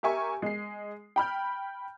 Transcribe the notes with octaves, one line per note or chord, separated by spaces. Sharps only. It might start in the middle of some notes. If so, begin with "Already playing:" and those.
G4 A#4 E5 G#5 C#6
G#3 C7
G5 B5 F6 G6